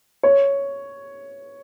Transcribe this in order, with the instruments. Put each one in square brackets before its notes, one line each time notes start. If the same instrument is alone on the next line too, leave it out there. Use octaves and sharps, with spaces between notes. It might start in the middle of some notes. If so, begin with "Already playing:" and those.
[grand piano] C#5